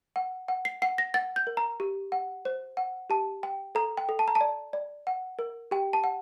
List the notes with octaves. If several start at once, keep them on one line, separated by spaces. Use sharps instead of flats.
F#5
F#5
C7
F#5 C7
A#6
F#5 A6
G6
A#4
A#5
G4
F#5
C5
F#5
G4 A5
G5
A4 A#5
G5
A4
A5
A#5
A5
D5
D5
F#5
A#4
G4 G5
A5
F#5